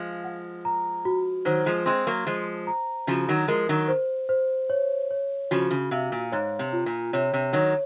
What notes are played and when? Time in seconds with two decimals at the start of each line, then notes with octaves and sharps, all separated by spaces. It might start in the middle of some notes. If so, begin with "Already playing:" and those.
Already playing: F3 G#3 F5
0.24 F#5
0.65 A#5
1.05 F#4
1.45 D#3 F#3 C5
1.66 F3 G#3
1.86 G#3 C4 C6
2.07 F#3 A#3
2.26 F3 G#3 C5
2.67 A#5
3.07 C#3 F3 F#4
3.29 D#3 F#3
3.48 F3 G#3 A#4
3.69 D#3 F#3
3.88 C5
4.29 C5
4.70 C#5
5.11 C#5
5.51 C#3 F3 F#4
5.71 C#3
5.91 C3 F5
6.12 A#2
6.32 G#2 C#5
6.59 C3
6.73 F4
6.86 A#2
7.13 C3 C#5
7.33 C3
7.53 D#3 F#3 C#5